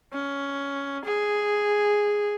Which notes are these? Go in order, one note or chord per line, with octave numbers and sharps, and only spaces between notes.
C#4
G#4